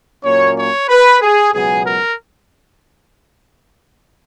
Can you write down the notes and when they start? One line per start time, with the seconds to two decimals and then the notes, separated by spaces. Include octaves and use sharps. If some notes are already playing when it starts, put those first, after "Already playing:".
0.24 A#2 F#3 A#3 C#4 C#5
0.56 C#5
0.89 B4
1.21 G#4
1.53 C#2 B2 F#3 B3 G#4
1.85 A#4